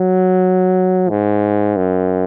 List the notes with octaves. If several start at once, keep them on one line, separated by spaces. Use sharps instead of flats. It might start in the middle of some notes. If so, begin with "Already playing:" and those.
Already playing: F#3
G#2
F#2